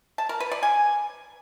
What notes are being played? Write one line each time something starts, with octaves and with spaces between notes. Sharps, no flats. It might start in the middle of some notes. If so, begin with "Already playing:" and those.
A5
A#4
B4
D5
G#5